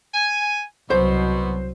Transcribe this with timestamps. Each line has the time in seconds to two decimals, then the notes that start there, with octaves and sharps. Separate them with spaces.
0.14 G#5
0.90 C2 B2 F#3 C5